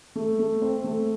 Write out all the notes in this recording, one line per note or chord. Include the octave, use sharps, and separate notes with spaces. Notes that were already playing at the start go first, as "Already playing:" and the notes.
A3
A3
C4
A3